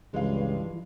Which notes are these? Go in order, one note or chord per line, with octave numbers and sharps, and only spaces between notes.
C#2 G2 E3 F3 G#3 F4